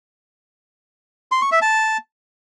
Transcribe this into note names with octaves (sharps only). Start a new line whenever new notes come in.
C6
C#6
E5
A5